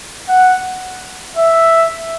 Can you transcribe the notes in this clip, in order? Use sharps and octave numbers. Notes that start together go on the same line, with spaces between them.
F#5
E5